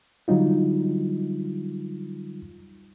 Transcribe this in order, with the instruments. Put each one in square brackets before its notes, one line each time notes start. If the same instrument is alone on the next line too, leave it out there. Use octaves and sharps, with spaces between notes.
[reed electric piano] D3 F#3 G3 D#4 F4